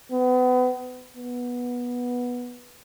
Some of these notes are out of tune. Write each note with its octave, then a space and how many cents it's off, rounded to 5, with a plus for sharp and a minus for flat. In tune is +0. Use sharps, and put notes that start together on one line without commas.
B3 +35
B3 -10